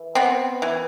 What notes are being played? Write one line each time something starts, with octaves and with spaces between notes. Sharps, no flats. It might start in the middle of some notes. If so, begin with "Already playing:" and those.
Already playing: E3
B3 C4
E3